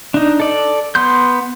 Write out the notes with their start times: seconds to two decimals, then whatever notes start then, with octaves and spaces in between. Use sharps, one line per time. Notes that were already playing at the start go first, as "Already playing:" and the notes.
0.14 D4 D#4
0.40 A4 D5
0.95 B3 C6 G6